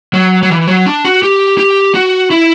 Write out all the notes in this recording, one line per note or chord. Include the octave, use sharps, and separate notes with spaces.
F#3
F#3
E3
F#3
D4
F#4
G4
G4
F#4
E4